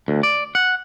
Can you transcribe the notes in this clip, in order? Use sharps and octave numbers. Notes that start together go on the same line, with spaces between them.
D2
D5
F#5